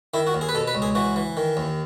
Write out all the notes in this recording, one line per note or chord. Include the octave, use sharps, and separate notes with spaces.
D#3 E4
F#4
D#2
G#4
B4
B2 A4
B4
C#2
G#4
E3 F#4
E3
D#3
D#2